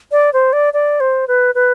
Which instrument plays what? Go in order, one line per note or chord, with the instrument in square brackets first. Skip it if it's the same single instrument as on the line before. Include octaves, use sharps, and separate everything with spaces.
[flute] D5
C5
D5
D5
C5
B4
B4